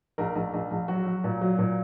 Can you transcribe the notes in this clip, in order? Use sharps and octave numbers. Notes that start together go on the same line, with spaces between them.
A#1 A#4
A#1
A#1
A#1
F#3 F#4
F#3
A#2
F#3
A#2